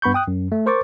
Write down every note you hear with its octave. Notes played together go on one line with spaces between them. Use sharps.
G2 B3 B5 C#6 G6
G5 D#6 F#6
F#2
A3
A#4 C5 C#6 D6 A6